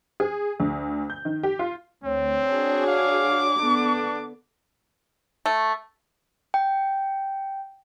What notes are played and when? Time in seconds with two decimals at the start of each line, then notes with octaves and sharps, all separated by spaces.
0.20 G#4
0.60 D2
1.10 G6
1.25 D#3
1.43 G4
1.59 F4
2.04 D2 C4 C#5
2.47 D4 F#4 G#4
2.87 F5 D6
3.59 D3 B3 D4
5.46 A3
6.54 G5